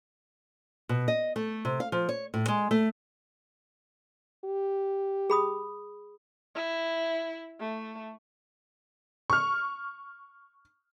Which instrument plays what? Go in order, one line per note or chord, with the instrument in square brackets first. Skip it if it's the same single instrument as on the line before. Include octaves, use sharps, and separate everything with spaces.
[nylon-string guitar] B2
D#5
A3
C3
F5
F3
C#5
A2
G#3
A3
[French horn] G4
[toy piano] G#4 B5 D#6
[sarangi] E4
A3
[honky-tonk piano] C#6 F6